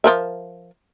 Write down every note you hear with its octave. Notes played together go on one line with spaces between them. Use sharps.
F3 A#4 E5